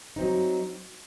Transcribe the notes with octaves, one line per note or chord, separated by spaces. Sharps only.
F#3 C4 D#4